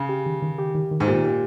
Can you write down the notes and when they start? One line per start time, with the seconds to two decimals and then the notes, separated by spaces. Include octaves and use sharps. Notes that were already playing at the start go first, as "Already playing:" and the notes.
Already playing: C#3
0.09 G4
0.26 D#3
0.42 D#3
0.58 G4
0.75 D#3
0.91 D#3
1.00 G#2
1.07 A#2 G4
1.24 G4